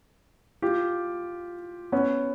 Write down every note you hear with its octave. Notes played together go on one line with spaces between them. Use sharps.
F4 G4
B3 C#4